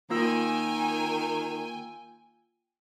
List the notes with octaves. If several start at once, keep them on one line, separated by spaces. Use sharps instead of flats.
D#3 A#3 F4 G5 G#5 E6